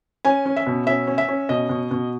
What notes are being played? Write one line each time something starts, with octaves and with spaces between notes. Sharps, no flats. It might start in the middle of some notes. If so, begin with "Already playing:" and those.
C#4 G#5
C#4
E5
B2
C#4 E5
C#4
E5
C#4
B2 D#5
B2
B2